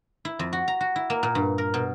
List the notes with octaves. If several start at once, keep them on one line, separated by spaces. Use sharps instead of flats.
E4
F2
F#4
A#5
F#4
E4
A#3
A#2
G2
A#4
B2